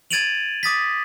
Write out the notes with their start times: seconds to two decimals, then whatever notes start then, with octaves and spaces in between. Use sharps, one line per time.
0.11 G#6 A6 D7 D#7 F7 F#7
0.63 D6 D#6 A6 B6